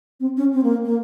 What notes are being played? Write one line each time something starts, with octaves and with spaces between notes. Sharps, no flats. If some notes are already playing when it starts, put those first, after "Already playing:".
C4
C#4
C4
A#3
A#3